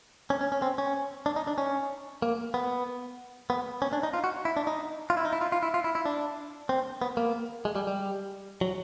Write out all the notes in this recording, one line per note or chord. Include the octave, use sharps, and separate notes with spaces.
C#4
C#4
C#4
C4
C#4
D4
D#4
D4
C#4
A#3
B3
B3
C#4
D4
D#4
F4
F#4
E4
D4
D#4
F4
E4
D#4
E4
F4
F4
E4
F4
E4
E4
D4
C4
B3
A#3
G#3
G3
G3
F#3